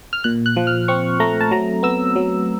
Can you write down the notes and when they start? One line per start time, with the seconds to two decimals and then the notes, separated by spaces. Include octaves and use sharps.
0.13 F6
0.24 A#2 F#6
0.46 F#6
0.56 F3
0.67 F6
0.88 C4 C#6
1.20 A3 A#5
1.41 A5
1.51 F#3 A#5
1.83 B3 E6
2.16 F#3